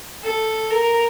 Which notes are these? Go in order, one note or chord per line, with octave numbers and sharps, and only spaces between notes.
A4
A#4